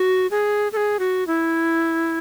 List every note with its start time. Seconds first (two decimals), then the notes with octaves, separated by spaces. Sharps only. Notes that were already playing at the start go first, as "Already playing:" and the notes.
Already playing: F#4
0.31 G#4
0.73 A4
0.77 G#4
0.99 F#4
1.27 E4